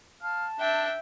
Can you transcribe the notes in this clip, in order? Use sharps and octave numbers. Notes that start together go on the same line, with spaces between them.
F5 A5
D4 E5 G5